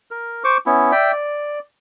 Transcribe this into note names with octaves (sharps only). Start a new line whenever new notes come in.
A#4
C5 C#6 D6
B3 C#4 E4
D5 E5 G5
D5